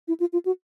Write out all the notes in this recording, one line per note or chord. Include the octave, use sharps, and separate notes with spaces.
E4
F4
F4
F#4